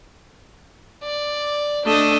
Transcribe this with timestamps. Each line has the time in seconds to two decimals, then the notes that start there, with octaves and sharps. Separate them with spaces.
1.03 D5
1.86 A3 D4 D#5